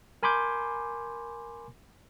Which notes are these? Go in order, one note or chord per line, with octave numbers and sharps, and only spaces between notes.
A#4 G#5 B5 C6 D6 G6